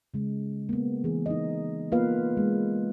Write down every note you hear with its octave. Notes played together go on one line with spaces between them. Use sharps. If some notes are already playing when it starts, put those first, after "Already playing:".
C#3 G#3
A#3 B3
E3 G#4
D#4 D#5
A#3 B3 F4 B4 F5
G#3